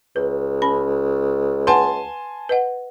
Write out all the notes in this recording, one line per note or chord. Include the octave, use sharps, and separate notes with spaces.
C#2 B4
C#4 B5
B4 F#5 G#5 A5 C6
B4 D#5 F#5